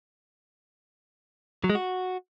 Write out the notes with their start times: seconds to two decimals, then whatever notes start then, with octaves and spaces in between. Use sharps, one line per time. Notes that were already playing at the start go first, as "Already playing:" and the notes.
1.64 F#3
1.70 G#3
1.75 F#4